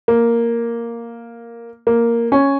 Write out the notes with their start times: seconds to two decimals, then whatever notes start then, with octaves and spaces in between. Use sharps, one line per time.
0.08 A#3
1.87 A#3
2.32 C#4